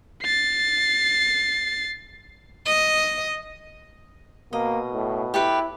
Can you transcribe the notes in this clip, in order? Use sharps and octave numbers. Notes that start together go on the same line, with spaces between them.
A6 C7
D#5
B2 A#3 D#5
A2
E4 G4 A4 B4